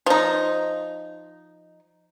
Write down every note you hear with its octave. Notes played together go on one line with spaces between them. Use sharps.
F3 D#4